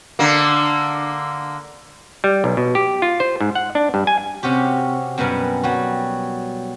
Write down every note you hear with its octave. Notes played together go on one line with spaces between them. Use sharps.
D3 A#3
G3
B1
B2
G4
F4
C5
G#2
F#5
D4
G2
G#5
C3 C#4 F#4 G4
F#2 B2 G3 A#4 F#5 G#5
F#3 G3 F#4